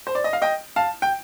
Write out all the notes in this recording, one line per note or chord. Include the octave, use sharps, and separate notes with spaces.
C5
D5
D#5
F5
D#5 G5
F5 A5
G5